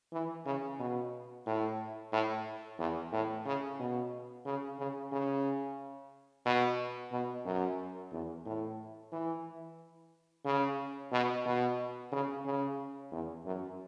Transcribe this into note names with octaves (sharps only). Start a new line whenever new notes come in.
E3
C#3
B2
A2
A2
E2
A2
C#3
B2
C#3
C#3
C#3
B2
B2
F#2
E2
A2
E3
C#3
B2
B2
C#3
C#3
E2
F#2